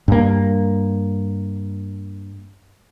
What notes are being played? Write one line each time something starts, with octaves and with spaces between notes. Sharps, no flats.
G2 A#3